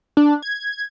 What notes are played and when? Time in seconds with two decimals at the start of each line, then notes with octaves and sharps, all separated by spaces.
0.17 D4
0.42 G#6